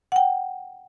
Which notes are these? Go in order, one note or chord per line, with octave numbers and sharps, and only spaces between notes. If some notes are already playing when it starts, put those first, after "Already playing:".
F#5 G5